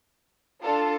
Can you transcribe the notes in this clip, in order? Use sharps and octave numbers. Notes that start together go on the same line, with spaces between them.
D4 F4 A4